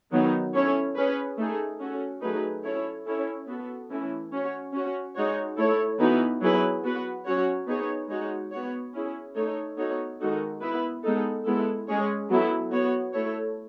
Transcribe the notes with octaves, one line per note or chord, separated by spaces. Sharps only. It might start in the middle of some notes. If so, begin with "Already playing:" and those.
D#3 F#3 B3 D#4
C#4 E4 A4 C#5
C#4 G#4 B4
A3 D#4 G#4
C#4 F#4 A4
F#3 A3 D#4 G#4 B4
C#4 E4 A4 C#5
C#4 E4 A4 C#5
B3 F#4 A4
E3 A3 C#4 E4
C#4 F#4 C#5
C#4 F#4 C#5
G#3 D#4 F#4 C#5
A3 E4 A4 C#5
E3 B3 D#4 F#4 B4
F#3 B3 E4 G#4 B4
B3 F#4 B4
F#3 C#4 F#4 C#5
B3 D#4 G#4 C#5
G#3 D#4 F#4 C#5
B3 F#4 C#5
C#4 E4 G#4
A3 D#4 A4 C#5
B3 D#4 F#4 A4 C#5
D#3 G#3 D#4 F#4 A4
B3 E4 B4
G#3 B3 D#4 A4
G#3 B3 E4 A4
G#3 C#4 G#4 C#5
F#3 B3 E4 A4
B3 F#4 C#5
A3 E4 A4 C#5